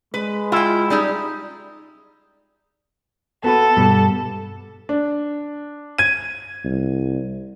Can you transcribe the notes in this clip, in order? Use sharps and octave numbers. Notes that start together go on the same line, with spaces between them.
G#3 B4
E4 F4 G5
G3 D#4 G#4
B3 F#4 A4 B4
G2 B2 G3
D4
G#6 D#7
C2